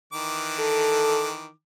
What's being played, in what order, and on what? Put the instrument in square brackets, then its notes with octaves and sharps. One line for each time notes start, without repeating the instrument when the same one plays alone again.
[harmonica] D#3 E3 D6
[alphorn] A4